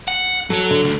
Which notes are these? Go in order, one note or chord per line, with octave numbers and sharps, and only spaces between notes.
F#5
F#3 F#4 A4
D3
D2